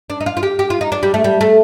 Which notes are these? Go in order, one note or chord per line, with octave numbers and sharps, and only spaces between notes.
D4
D#4
F4
F4
G4
G4
F4
D#4
D4
G3
A3
G3
A3